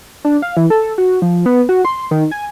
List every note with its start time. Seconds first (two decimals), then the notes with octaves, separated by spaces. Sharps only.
0.25 D4
0.42 F5
0.57 E3
0.70 A4
0.98 F#4
1.22 F3
1.46 B3
1.69 F#4
1.85 C6
2.11 D#3
2.31 G#5